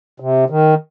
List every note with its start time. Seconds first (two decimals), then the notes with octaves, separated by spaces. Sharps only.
0.20 C3
0.50 D#3